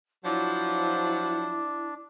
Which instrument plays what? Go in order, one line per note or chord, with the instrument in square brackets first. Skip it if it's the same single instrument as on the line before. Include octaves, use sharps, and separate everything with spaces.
[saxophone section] F3 F#3 [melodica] D4 [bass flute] E4